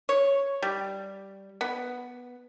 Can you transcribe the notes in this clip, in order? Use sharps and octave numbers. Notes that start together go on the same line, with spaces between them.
C#5
G3
B3